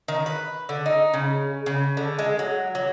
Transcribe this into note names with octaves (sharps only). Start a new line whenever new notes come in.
D#3
B4
D3
D#4
C#3
C#3
D3
G#3
F#3
F#3